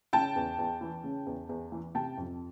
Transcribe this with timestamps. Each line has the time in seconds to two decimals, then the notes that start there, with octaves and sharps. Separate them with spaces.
0.13 C#3 G5 A5
0.36 E2
0.58 E2
0.81 E3
1.04 C#3
1.26 E2
1.49 E2
1.72 E3
1.95 C3 G5 A5
2.17 F2